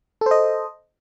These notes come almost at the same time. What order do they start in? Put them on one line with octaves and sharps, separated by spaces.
A4 C5 D#5